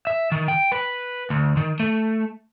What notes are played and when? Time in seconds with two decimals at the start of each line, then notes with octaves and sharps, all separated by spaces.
0.07 E5
0.32 D#3
0.48 G5
0.72 B4
1.30 D2
1.57 D#3
1.80 A3